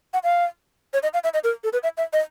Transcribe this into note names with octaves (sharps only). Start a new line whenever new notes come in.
F#5
F5
C#5
D#5
F5
E5
D#5
A#4
A4
B4
E5
E5
D#5